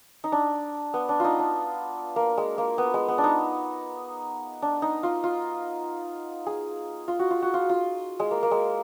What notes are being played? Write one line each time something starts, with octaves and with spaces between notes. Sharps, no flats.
D#4
D4
B3
D4
D#4 F4
D4
A#3
G#3
A#3
B3
G#3
B3
D4
D#4
D4
D#4
F4
F4
G#4
F4
F#4
F4
F#4
F4
F4
G#3
A#3
A#3
G#3